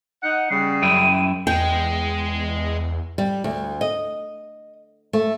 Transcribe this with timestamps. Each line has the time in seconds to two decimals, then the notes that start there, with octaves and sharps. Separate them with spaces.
0.23 D#4 F#5
0.50 C#3 G3 C7
0.82 F#2 E4 G5 D#7
1.47 E2 G#3 G5
3.18 G3
3.44 D2
3.81 D#5
5.13 A3